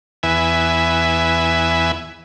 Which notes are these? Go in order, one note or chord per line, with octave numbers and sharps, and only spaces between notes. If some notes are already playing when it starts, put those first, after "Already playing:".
E2 B4 E5 G#5